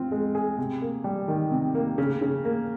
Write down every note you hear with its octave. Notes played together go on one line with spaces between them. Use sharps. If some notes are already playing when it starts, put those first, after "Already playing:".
Already playing: C4 F4
G#3
G#4
C3
A#3
G3
D#3
C3
A#3
C#3
C#3
A#3